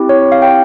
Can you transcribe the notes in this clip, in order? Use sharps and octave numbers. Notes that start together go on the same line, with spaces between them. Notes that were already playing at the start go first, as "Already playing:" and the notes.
Already playing: C4 E4 G4
C#5
F5
G5